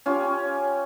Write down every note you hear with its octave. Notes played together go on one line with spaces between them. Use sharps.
C#4 F4 G4